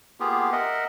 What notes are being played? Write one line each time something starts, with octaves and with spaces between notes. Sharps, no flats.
A#3 B3 F4 G4 G#4
A#4 D#5 E5 F#5